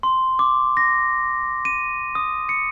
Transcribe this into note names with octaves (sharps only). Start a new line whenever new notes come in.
C6
D6
A#6
D#7
D#6
C#7